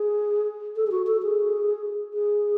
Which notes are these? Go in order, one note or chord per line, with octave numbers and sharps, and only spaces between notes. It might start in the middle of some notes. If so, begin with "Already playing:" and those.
Already playing: G#4
A4
G#4
F#4
A4
G#4
G#4